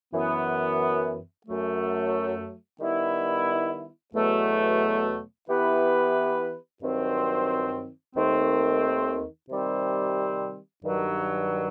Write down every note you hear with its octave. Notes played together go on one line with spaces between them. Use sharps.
F#2 E3 B3
F#2 F#3 A3
D#3 G3 B3 E4
E2 B2 F#3 A3
E3 B3 E4 G4 B4
G2 D#3 F#3 C4
D#2 D#3 A3 C4
C3 D#3 G3 C4
G2 D#3 F#3